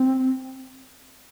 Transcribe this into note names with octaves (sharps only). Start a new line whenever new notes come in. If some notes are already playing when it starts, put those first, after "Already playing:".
Already playing: C4